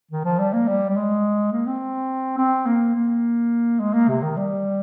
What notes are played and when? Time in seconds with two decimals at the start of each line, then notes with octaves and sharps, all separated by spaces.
0.11 D#3
0.25 F3
0.39 G3
0.53 A#3
0.68 G3
0.90 G3
0.96 G#3
1.52 A#3
1.67 C4
2.38 C4
2.66 A#3
2.95 A#3
3.80 G#3
3.94 A#3
4.09 C3
4.23 D#3
4.37 G3